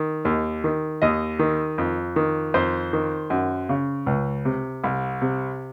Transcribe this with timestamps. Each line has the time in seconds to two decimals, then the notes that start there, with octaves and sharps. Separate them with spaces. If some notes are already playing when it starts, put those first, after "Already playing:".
Already playing: D#3
0.25 D#2
0.64 D#3
1.02 D#2 D#5
1.39 D#3
1.78 F2
2.16 D#3
2.54 F2 C5
2.93 D#3
3.30 F#2
3.69 C#3
4.06 C#2
4.45 C3
4.84 C2
5.22 C3